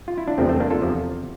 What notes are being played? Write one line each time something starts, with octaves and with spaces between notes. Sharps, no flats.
F4
E4
D4
E2 C3 F3 A3 C4
A3 C4
A#3 D4
F4 A4
E2 C3 F3